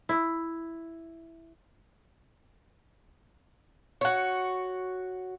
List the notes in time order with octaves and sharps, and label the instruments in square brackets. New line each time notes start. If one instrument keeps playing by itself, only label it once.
[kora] E4
[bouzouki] F#4 C#5